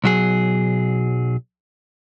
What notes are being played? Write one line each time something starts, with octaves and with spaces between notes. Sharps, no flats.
B1 F#3 G#4